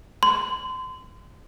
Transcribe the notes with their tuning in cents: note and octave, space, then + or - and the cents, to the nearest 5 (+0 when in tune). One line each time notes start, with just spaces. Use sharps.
C6 -35